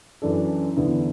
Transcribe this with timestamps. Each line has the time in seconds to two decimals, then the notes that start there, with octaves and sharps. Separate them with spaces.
0.22 F#2 E3 D4 A4
0.77 E2 D3 B3 E4